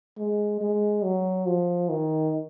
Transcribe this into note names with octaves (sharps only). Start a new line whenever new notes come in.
G#3
G#3
F#3
F3
D#3